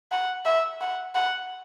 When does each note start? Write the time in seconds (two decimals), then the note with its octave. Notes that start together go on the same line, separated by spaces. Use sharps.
0.12 F#5
0.45 E5
0.81 F#5
1.15 F#5